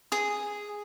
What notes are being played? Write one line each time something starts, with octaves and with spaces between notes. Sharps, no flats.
G#4 D#6